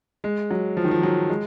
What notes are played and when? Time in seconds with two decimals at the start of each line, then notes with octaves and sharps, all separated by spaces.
0.24 G#3
0.51 F#3
0.77 F3
0.84 D#3
0.91 F3
1.03 F#3
1.29 G#3